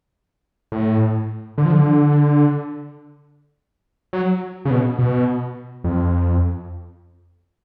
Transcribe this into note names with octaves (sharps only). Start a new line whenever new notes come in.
A2
D3
F3
D3
F#3
C#3
B2
B2
F2